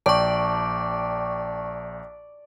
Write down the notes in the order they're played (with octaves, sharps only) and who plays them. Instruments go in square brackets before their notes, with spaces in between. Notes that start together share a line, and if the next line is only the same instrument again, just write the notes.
[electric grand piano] A#1 G5 [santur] D5 [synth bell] A5 C#6